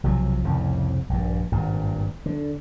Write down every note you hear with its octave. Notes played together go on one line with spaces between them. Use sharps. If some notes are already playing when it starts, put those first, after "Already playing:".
B1 C3 F3 F#3
C2 F2 A2 C#3
A#1 G2
G#1 G2 A#2
D3